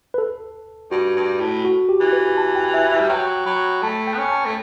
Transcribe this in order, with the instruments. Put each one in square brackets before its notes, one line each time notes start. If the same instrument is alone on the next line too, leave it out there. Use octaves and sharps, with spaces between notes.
[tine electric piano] B4
A4
[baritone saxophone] G2 [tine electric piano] F#4
[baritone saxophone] G2
A2
[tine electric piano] F#4
G4
[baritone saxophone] E3
[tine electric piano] B4
A5
G5
E5
E5
[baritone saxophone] G3
[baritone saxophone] F#3 [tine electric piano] G5
[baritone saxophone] F#3 [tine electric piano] B5
[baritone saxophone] A3 [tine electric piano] A5
[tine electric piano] G5
[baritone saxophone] B3
C#4
[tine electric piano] A5
[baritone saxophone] A3